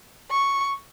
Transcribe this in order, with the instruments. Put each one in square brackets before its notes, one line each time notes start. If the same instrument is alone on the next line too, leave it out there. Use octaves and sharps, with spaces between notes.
[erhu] C#6